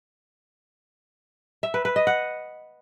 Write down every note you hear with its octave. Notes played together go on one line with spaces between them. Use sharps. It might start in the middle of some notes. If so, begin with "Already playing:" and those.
E5
B4
B4
D#5
F#5